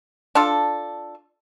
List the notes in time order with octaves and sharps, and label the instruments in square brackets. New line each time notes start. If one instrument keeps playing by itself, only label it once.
[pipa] D4 F4 A4